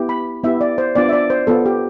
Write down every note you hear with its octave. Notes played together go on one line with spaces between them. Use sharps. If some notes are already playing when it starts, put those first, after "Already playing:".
Already playing: B3 E4 G4
B5
B3 E4 G4 E5
D5
C5
B3 D4 F4 D5
E5
D5
C5
B3 F4 A4
G4